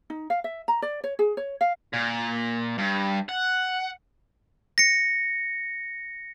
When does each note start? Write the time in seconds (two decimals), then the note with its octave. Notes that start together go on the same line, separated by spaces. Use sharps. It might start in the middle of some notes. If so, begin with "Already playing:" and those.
0.10 D#4
0.30 F5
0.44 E5
0.68 A#5
0.82 D5
1.04 C#5
1.19 G#4
1.37 C#5
1.61 F5
1.93 A#2
2.79 G2
3.29 F#5
4.78 A#6 C#7